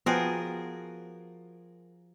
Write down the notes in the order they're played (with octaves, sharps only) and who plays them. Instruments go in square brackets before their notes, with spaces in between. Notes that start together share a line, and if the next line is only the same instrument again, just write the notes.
[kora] F3 F#4 [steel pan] B3 G5 [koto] G#4 A#4